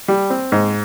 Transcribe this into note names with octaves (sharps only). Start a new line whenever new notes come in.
G3
C4
G#2